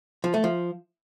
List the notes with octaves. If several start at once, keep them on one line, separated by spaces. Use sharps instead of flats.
F3
A3
F3